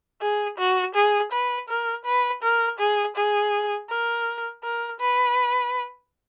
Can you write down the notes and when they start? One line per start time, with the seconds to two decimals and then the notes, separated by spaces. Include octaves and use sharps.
0.21 G#4
0.58 F#4
0.95 G#4
1.32 B4
1.69 A#4
2.05 B4
2.43 A#4
2.79 G#4
3.16 G#4
3.89 A#4
4.64 A#4
5.00 B4